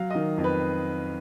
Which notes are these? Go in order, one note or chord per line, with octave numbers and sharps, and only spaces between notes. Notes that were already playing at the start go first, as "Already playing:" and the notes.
Already playing: F#3 F5
D#3 D#5
F2
B4